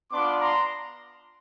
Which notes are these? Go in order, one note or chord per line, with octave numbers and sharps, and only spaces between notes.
B3 D4 F4 C6 D6
A#5 C6